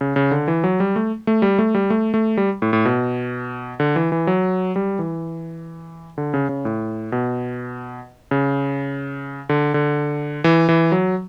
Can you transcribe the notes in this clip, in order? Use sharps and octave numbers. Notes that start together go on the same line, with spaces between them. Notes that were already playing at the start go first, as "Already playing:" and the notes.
C#3
C#3
D3
E3
F#3
G3
A3
A3
G3
A3
G3
A3
A3
G3
A2
A2
B2
D3
E3
E3
F#3
G3
E3
D3
C#3
C#3
A2
B2
C#3
D3
D3
E3
E3
F#3